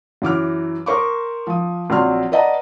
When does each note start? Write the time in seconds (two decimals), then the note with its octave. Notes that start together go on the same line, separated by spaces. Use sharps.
0.22 F#2 E3 D6 F6
0.86 A#4 C5 C#6 D6
1.47 F3 D#6
1.90 A#1 F#3 C4 D5 C6 F6
2.32 B4 D5 D#5 F#5 A5 A#5